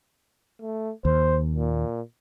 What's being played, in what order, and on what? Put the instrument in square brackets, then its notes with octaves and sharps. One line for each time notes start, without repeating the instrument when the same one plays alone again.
[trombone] A3
[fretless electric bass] D#2 [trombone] C5
[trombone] A#2